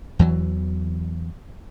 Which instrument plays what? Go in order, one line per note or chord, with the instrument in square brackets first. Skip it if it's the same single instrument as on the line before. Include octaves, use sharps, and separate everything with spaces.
[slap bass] E2 E3 F#3